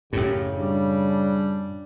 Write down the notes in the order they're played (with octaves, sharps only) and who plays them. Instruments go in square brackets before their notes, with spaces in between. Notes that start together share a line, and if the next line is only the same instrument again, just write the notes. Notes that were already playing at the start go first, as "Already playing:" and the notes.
[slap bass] F#2 A2 [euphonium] C#3 [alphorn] G4
[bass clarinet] G3 [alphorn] D4